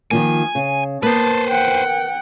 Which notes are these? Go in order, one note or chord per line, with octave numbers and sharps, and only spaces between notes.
D#3 F3 A#3 G#5
C#3
A#3 B3 B4 C5 A5
F#5 G5